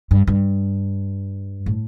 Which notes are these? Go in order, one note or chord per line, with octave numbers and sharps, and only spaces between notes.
G2
G2
A2